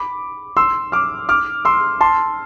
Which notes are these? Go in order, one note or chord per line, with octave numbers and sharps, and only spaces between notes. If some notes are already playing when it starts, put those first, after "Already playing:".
Already playing: B5 D6
C6 E6
D6 F6
D6 F6
C6 E6
A5 C6